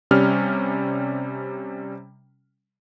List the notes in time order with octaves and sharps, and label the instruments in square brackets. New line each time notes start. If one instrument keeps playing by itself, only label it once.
[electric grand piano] C3 G3 C#4 F6